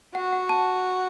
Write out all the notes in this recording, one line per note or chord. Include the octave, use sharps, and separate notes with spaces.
F#4 F#5
F#5
A5